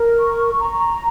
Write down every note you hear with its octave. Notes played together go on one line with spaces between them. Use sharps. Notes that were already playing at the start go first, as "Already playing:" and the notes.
Already playing: A#4
C#6
A#5